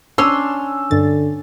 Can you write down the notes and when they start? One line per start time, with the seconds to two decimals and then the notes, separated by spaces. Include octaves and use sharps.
0.18 C#4 D4 C6 E6
0.91 G2 D3 A6